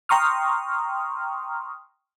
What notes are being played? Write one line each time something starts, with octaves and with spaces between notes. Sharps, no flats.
G5 A#5 C6 C#6 D#6 F6